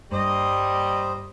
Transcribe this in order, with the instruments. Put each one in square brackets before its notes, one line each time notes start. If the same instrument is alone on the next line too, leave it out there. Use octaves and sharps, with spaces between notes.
[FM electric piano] G2 [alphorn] G3 [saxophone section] A#3 D#5 [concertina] C5